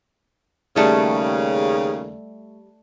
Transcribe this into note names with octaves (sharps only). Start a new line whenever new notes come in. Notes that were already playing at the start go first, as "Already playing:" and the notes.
D#2 C#3 G3 A3